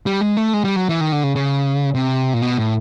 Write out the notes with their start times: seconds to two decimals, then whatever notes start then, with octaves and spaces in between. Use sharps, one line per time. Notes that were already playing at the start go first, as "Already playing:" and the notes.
0.06 G3
0.21 G#3
0.37 A3
0.54 G#3
0.64 G3
0.76 F#3
0.89 E3
1.01 D#3
1.12 D3
1.24 C#3
1.36 C#3
1.95 C3
2.34 A#2
2.42 B2
2.58 A2